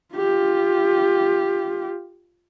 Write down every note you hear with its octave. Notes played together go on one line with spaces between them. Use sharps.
F4 G4